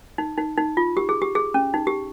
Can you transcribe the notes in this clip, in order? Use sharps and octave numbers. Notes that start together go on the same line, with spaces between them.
D#4
D#4
D#4
F4
G4
G#4
G4
G#4
C#4
D#4
G4